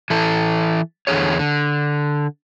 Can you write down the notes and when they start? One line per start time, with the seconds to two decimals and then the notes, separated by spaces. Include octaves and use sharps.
0.10 E3 A4
1.07 E2 D3 G#4 C#5
1.39 D3